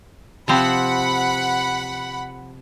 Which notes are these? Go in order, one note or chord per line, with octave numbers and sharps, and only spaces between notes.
C3 F3 C4 F#5 B5